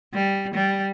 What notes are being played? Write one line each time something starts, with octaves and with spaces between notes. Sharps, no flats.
G3
G3